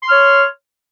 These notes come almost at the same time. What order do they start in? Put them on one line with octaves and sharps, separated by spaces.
C6 F6 C#5